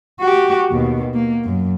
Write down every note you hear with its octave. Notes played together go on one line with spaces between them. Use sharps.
F#4 G4
D#2 B2
A#3
F#2